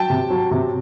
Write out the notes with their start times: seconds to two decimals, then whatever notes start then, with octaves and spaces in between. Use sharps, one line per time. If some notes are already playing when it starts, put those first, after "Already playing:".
Already playing: F#3 G5 A5
0.10 C3
0.30 F#3
0.51 C3